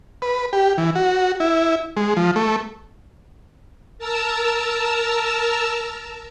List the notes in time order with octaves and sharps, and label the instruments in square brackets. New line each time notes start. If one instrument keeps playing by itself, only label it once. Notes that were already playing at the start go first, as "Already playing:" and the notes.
[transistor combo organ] B4
G4
E3
F#4
E4
G#3
F3
A3
[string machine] A#4 A5 A#5 E6